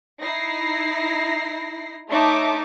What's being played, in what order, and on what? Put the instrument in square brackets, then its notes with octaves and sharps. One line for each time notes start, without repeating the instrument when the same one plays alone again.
[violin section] D#4 E4 A#6 C7
A3 D#4 C#5 E5 A5 D6